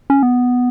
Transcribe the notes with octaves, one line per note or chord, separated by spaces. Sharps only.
C#4
B3